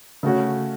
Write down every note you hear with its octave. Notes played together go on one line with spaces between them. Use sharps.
C#3 A3 C#4 F#4